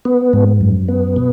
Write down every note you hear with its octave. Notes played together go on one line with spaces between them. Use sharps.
B3
G#2
F#2
B3
B2